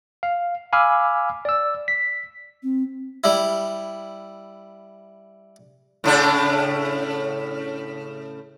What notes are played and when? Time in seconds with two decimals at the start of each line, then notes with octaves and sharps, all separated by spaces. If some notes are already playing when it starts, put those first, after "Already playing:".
0.23 F5
0.73 F5 G#5 B5 D6 E6 F6
1.45 D5 E6
1.88 B6
2.63 C4
3.24 G3 E4
6.04 A2 C#3 D4